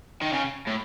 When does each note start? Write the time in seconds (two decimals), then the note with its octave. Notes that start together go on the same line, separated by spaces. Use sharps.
0.21 D#3
0.33 C#3
0.67 A2